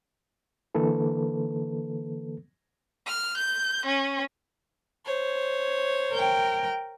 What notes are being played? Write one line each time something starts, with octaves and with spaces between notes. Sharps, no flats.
D3 E3 A#3 A4 B4
F6
G6
C#4
C5 C#5
A#4 G5